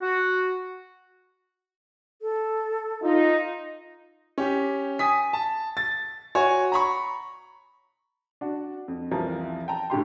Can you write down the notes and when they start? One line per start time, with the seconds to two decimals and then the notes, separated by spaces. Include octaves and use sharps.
0.02 F#4
2.22 A4
3.02 D#4 F4
4.38 C#4 G4
4.99 G#5 D#6 B6
5.33 A5
5.77 A6
6.35 F#4 C#5 G#5
6.72 A#5 B5 C#6
8.41 D4 F#4
8.88 F2
9.11 C2 F2 C3 E3 F3 A#4
9.68 G5 A5 A#5
9.90 A2 D3 G4 C6